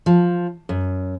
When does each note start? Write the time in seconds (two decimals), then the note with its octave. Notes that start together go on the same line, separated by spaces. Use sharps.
0.06 F3
0.69 F#2